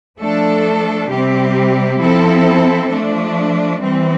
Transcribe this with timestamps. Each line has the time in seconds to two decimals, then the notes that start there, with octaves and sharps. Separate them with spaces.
0.21 F3 A3 D4 A4
1.10 C3 G3 C4 G4
2.01 F3 C4 E4 A4
2.90 F3 A3 D4
3.81 E3 G3 C4